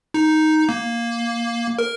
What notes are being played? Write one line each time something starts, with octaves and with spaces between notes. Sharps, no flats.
D#4
A#3
A#4